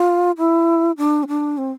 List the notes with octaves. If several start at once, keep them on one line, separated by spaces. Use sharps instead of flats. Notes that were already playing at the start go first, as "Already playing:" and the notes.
Already playing: F4
E4
D4
C4
D4
C4